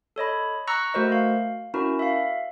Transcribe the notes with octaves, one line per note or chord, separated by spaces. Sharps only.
A4 C#5 D#5 B5
A#5 C#6 E6 F#6 A#6 C#7
A3 F#4 A#4 C5 D#5
F5
C#4 E4 F#4 A#4
E5 F5